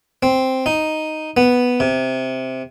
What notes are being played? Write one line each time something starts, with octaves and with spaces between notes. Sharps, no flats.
C4
D#4
B3
C3